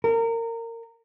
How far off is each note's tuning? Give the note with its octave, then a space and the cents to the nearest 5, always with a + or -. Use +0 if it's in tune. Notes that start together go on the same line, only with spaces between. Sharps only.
A#4 -25